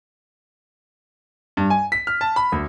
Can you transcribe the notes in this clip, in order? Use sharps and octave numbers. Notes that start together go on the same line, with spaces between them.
G2
G#5
B6
F6
A5
B5
D2